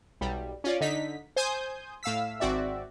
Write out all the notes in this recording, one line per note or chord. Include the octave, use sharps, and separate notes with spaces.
B1 G3
C#4 F4 D5
D3 D#4 B6
C5 G#5 D#6 G6
A2 F5 E6 B6
G#1 C4 F#4 D5 E5